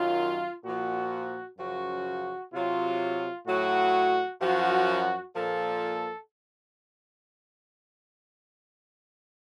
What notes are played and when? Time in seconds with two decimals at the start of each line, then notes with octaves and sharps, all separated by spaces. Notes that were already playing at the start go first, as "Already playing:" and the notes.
Already playing: F#2 D#3 F#3 F4
0.64 A#2 F3 F#4
1.58 F#2 C#3 F3 F#4
2.53 C3 F#3 F4
3.47 A2 F#3 F#4
4.41 F#2 F3 F#4
5.35 A#2 F3 A4